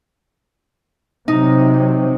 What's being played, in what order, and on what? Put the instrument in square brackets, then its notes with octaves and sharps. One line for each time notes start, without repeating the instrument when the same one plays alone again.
[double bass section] C3 F#3 [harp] D#4